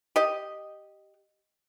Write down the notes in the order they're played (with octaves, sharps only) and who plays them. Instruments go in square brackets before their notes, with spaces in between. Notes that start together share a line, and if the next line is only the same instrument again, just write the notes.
[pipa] G4 D#5